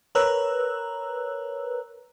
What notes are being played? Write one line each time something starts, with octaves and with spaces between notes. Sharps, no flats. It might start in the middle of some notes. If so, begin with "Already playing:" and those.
A#4 B4 C#5 A#5 E6 F#6